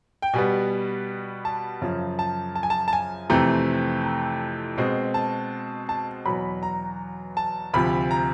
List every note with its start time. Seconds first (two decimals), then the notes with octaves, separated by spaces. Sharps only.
0.22 G5
0.33 B2 G3 B3 G#5
1.45 A5
1.82 F#2 C#3 F3
2.19 A5
2.55 A5
2.63 G#5
2.70 A5
2.88 A5
2.93 G#5
3.30 F2 C3 E3 A3 C4 A#5
4.04 A#5
4.77 B2 G#3 C4
5.14 A5
5.89 A5
6.26 E2 B2 F#3 B5
6.63 A#5
7.37 A5
7.74 D2 C3 F3 B5
8.11 A#5